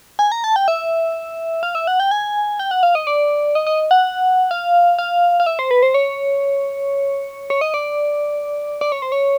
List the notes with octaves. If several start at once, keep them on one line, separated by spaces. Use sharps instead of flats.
G#5
A#5
A5
G5
E5
F5
E5
F#5
G5
G#5
G5
F#5
F5
D#5
D5
D#5
D#5
F#5
F5
F5
F5
E5
C5
B4
C5
C#5
C#5
D#5
D5
D5
C#5
C5
C#5